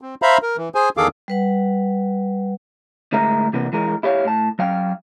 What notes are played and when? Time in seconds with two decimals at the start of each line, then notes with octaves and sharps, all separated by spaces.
0.01 C4
0.22 C5 E5 F5 A#5 B5
0.43 A#4
0.57 E3
0.75 G#4 C5 G#5
0.97 E2 D#3 G#4 A4 F5 D6
1.28 G3 B4 F#5
3.12 D2 A2 G#3 A#4 E5 A#5
3.53 C3 E3 A#3 B3
3.73 E3 G#3 A#4
4.03 E4 G4 C#5 E5 F5
4.25 A2 A5
4.59 F#3 F5 G5